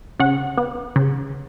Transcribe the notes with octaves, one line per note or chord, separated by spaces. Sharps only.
C#3 F#5
B3
C#3